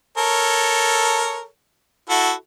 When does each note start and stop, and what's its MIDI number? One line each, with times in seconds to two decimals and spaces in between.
0.17 1.46 69
0.17 1.46 70
0.17 1.46 73
2.10 2.32 64
2.10 2.32 66
2.10 2.32 69